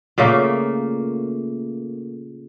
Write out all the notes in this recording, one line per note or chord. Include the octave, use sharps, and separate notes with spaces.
A#2 C#3 A3 A#3